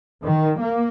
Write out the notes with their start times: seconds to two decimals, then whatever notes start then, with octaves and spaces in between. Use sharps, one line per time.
0.23 D#3
0.60 A#3